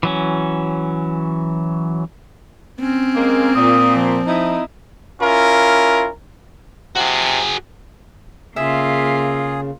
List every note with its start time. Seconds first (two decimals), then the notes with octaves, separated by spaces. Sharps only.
0.03 E3 F#3 C#4
2.81 C4 C#4
3.15 G#3 A#3
3.55 A#2 D#6
3.96 F3
4.27 D#4 E4
5.21 C#4 E4 F4 A#4
6.96 C3 F#4 G#4
8.56 C#3 A#3 F4 G#4 E5